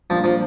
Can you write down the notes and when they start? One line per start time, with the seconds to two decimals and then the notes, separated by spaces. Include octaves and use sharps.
0.10 A#2 F3 G3 A#3 D4
0.24 F3